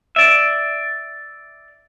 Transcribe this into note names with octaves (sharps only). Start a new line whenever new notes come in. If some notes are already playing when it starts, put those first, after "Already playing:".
D5 E5